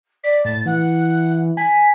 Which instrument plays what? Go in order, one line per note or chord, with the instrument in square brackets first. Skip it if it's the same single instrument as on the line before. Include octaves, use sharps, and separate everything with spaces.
[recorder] D5 [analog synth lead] B6
[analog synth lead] A2 [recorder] A6
[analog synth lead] E3 [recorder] F#5
[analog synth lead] G#5 [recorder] B6